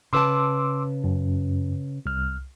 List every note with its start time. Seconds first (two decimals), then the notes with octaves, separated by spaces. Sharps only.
0.13 C#3 B4 A5 C6 D6 E6
1.04 F#2
2.06 C2 F6